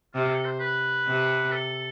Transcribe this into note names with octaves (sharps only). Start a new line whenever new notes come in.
C3 F4
A4
C5
B4
C3
A4